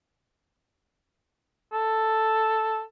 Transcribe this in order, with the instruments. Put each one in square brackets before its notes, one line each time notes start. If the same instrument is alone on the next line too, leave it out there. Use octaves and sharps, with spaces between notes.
[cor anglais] A4